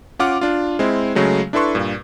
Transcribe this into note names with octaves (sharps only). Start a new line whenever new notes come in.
C#4 F4 F#5 D6 F6
D4 F4
G#3 C4 E4
C#3 F#3 G#3 A3
D4 E4 A4 B4 C6 C#6
G2 A#2